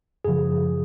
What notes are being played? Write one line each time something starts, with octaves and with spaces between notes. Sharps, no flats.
F#2 C#3 F3 G#4